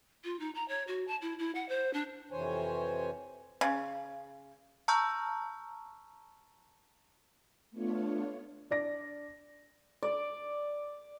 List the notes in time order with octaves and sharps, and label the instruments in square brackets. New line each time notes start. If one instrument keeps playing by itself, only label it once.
[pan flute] F4
D#4
A#5
C#5
F#4
A5
E4
E4
F#5
C5
D4
[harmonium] F2 C3 E3 C5 C#5 G#5
[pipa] C#3
[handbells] A5 A#5 C#6 E6 F6 G6
[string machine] A3 B3 D4 F4 C#5
[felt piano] D4 D5 A#6
[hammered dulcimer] D5